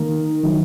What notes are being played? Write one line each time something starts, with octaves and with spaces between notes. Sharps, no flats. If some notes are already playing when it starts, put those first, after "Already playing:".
Already playing: D#3 A#3 D#4 A#4
D#3 F#3